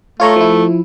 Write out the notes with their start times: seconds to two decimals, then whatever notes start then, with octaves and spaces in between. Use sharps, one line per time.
0.20 A3 F4 C#5 A#5
0.36 F3 E4